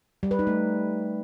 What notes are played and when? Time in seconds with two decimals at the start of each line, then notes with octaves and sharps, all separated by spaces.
0.23 G3
0.31 B4
0.39 D#4
0.47 A3